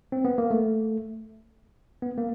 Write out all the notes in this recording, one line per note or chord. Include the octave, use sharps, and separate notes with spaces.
C4
B3
A#3
A3
B3
A#3